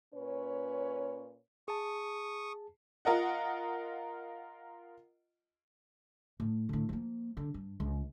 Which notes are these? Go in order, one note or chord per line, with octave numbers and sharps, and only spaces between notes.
A#2 C#4 B4 C#5
G#4 A5 C#6 D#6
F4 A#4 D#5 F#5
A2
A2 D3
F3 A#3
D3
G2
C#2